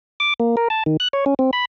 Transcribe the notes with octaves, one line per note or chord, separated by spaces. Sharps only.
D6
A#3
A#4
A5
D#3
F#6
C#5
C#4
C4
B5